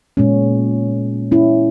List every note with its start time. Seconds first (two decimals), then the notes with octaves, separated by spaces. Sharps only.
0.17 A#2 G#3 B3 C#4
1.32 C#4 E4